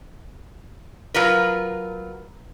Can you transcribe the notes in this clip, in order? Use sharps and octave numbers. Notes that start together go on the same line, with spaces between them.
F#3 F4 A#4 B4